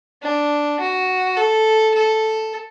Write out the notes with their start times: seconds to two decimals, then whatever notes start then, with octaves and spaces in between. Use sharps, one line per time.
0.22 D4
0.80 F#4
1.37 A4
1.94 A4